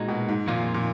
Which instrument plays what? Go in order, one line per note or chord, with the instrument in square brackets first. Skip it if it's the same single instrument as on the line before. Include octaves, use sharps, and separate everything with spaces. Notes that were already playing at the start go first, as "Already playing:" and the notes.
Already playing: [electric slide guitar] A#2 G#3 D#4 F#4
[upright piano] B2
G#2
[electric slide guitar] F2 D#3 A#3 F4 [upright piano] A#2
[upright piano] A#2